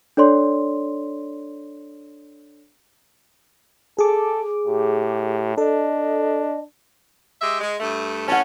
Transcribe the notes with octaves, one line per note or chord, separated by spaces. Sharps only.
D4 A4 C#5 D5 C6
G#4 A4 D6
A2 G4
D4 A4 D#5
G#3 G4 E5
G#3
G2 A3
A2 C#4 F#5 A5